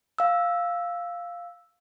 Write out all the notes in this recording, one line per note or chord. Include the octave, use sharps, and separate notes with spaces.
F5 E6